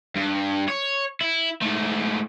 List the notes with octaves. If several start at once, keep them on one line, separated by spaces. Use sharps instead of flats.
G2
C#5
E4
G#2 A3